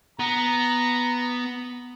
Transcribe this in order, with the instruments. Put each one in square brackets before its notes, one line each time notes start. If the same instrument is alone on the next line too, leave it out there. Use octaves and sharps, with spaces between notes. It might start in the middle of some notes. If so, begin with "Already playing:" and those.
[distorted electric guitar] B3 [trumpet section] A#5